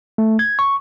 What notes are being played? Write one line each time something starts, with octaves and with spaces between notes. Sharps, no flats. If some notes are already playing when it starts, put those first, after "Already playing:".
A3
G#6
C#6